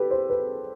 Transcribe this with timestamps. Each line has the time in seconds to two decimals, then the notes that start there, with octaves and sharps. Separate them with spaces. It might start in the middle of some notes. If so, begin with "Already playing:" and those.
Already playing: G4 A4 B4
0.11 C5
0.30 B4